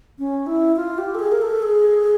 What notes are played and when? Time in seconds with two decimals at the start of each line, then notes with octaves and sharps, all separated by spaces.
0.19 C#4
0.47 E4
0.76 F4
0.98 G4
1.15 A4
1.19 G#4
1.32 A#4
1.41 A4
1.62 G#4